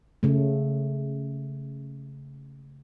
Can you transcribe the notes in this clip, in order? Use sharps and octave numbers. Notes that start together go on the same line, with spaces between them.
C#3 A3